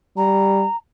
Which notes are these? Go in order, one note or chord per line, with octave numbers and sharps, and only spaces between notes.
G3 A#5